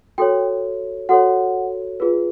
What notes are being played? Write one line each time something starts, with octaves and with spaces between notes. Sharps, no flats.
F#4 A4 C#5 G5
F#4 A4 C#5 F#5
F4 G#4 B4